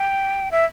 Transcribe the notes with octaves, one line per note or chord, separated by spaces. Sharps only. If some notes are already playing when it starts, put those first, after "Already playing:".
Already playing: G5
E5